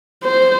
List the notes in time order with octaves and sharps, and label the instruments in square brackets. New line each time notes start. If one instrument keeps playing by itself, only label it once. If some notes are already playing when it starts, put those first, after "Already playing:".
[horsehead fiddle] C5